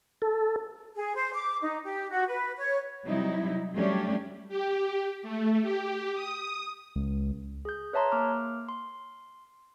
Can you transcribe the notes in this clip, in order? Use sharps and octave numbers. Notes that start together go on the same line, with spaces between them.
A4
G#4
C5
D6
D#4
G4
F#4
B4
C#5
C3 F#3 G3 D#4 E4
F#3 G3 A3 C#4 D4 G4
G4
A3
G4
D#6
C#2
G#4 G6
B4 C#5 E5 A5 A#5 C6
A#3 D6 F6
C6